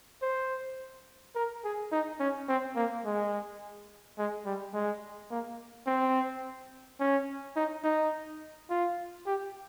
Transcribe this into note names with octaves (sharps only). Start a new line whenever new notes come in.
C5
A#4
G#4
D#4
C#4
C4
A#3
G#3
G#3
G3
G#3
A#3
C4
C#4
D#4
D#4
F4
G4